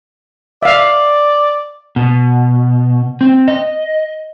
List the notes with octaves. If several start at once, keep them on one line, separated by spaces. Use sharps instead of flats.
D5 E5 F5
B2
C4
D#5